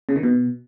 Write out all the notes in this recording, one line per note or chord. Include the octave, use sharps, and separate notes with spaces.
C#3
D#3
B2